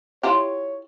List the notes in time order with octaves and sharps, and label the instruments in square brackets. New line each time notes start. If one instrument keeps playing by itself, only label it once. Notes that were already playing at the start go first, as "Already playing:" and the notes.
[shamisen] E4 F4 G4 [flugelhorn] C#5